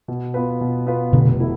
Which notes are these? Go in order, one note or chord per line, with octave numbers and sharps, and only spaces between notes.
B2
B3 F4 B4
B2
B3 F4 B4
F1 B2 D3
B2 A3 E4